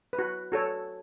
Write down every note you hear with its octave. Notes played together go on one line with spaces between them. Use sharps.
B4
F#4
F#4 A4 C#5